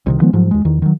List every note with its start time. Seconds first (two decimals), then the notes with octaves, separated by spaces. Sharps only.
0.06 C2 C3 D#3
0.21 D#3 F3 G#3 B3
0.33 G#2 F3 F#3
0.51 D#2 G#3
0.65 E2 D#3
0.82 D#3 F#3